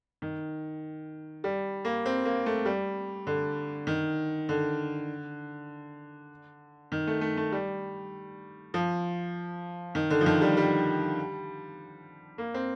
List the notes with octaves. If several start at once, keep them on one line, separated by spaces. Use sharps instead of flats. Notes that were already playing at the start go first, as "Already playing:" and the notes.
D#3
G3
A#3
C4
A#3
A3
G3
D3
D#3
D3
D#3
A3
A3
A3
G3
F3
D#3
D3
F3
D#3
G3
G3
A#3
C4